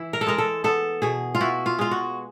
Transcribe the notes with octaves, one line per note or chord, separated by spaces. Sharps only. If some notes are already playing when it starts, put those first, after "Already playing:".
Already playing: E3 E4
A#4
A4
G#3 A#4
A4
B3 A4
B2 G#4
F4
E4 F#4
F4
G#3 F4
F#4